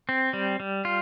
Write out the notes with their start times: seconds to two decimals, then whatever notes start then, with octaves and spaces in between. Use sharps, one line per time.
0.09 C4
0.33 G3
0.60 G3
0.85 F4